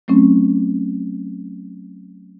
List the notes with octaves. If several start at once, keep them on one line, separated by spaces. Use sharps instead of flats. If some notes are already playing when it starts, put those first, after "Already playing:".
F#3 A3 C4 C#4